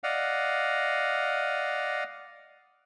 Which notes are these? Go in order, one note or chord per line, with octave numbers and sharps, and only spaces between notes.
D5 D#5 F5 F#5